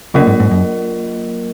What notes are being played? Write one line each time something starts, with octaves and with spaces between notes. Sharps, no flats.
C#3 F#3 A#3 F4 A#4 D#5
G#2
G#2
F#2